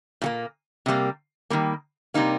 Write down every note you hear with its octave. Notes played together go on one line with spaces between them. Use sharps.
A#2 G3 A#3
C3 G3 A#3
D#3 G3 A#3
C3 G3 A#3 D#4